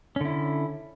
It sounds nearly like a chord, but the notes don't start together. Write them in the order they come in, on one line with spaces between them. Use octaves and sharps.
C#4 D3 E4